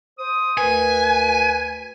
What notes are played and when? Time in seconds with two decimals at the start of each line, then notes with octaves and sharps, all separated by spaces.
0.19 C5 D#6
0.57 D2 A#4 B4 G#5